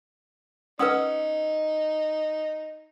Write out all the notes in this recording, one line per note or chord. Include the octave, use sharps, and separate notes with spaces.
C#4 D#4 B4 F#5 D#6 E6